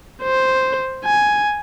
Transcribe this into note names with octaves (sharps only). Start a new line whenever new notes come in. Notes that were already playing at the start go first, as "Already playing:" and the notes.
C5
G#5